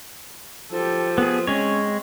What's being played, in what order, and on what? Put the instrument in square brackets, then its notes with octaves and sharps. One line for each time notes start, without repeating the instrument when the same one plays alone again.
[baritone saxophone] F3 [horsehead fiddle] G4 A4
[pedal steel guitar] B3 G#4
[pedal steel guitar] G#3 C#5 [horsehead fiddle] C4 [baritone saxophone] C#4